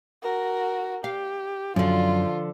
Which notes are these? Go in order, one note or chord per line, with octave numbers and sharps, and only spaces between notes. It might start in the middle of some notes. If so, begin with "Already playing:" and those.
F#4 A#4
G4 F5
F#2 D3 F3 F4